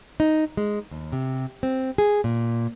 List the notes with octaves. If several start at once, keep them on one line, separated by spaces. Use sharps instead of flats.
D#4
G#3
D#2
C3
C4
G#4
A#2